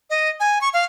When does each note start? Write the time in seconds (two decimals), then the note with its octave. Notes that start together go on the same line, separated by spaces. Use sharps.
0.10 D#5
0.40 G#5
0.61 C#6
0.74 F5